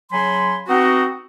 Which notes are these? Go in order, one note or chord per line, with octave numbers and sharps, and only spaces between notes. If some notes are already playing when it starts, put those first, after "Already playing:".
C#3 F#3 G#5 B5 C6
B3 C4 D#4 F#4